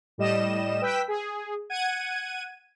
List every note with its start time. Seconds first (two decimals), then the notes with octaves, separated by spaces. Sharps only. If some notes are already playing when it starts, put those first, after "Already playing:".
0.18 A2 G3 D#5 E7
0.81 B4 G5 E6 B6
1.08 G#4
1.70 F#5 G#6 D#7